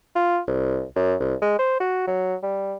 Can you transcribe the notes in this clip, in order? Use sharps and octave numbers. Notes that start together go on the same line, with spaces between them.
F4
C2
F#2
C2
G#3
C5
F#4
F#3
G3